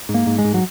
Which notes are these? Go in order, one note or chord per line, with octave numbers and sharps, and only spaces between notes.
G#2
A#3
G#2
G#3
G#2
F#3